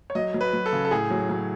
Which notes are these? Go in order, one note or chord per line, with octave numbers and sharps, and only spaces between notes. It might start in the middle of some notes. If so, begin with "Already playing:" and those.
C#5
F#3 D#5
F#3
B4
F#3
A4
C#3
A4
A2 G#4
F#3
F#3